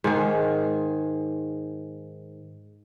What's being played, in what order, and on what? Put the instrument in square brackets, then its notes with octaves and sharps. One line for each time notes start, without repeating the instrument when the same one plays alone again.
[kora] G#2 D#3 G#4